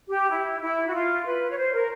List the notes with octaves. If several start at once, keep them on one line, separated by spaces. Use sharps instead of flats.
G4
E4
E4
F#4
F4
B4
C#5
C5
A#4